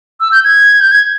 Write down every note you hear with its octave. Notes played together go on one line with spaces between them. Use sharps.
E6
G6
G#6
G6
G#6